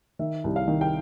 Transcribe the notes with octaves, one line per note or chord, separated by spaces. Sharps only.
D#3 E5
C2
F5
D#3
G5